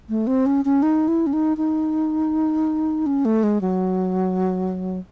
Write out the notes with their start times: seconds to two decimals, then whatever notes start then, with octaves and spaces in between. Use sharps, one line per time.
0.09 A3
0.27 C4
0.46 C#4
0.65 C#4
0.83 D#4
1.08 E4
1.27 C#4
1.33 D#4
1.57 D#4
3.06 C#4
3.25 A3
3.43 G#3
3.61 F#3